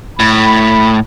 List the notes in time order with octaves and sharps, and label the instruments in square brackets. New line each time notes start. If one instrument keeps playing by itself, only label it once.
[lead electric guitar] A2 [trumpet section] B5